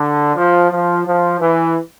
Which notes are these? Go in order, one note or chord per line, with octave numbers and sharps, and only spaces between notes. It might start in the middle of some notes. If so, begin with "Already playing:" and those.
Already playing: D3
F3
F3
F3
E3